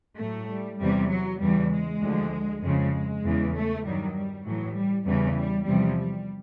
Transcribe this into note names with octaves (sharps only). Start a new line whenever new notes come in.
A2 F#3 A3
G3
E2 C3 E3 G3
F#3
E2 C#3 E3 G3
G#3
D2 D3 F3
F2 C#3 F3 G#3
E2 C#3 E3
A3
G2 D#3 F#3 G3
G3
A2 E3 F#3
G3
E2 C#3 E3 G3
G3
E2 C3 F3 G3
G3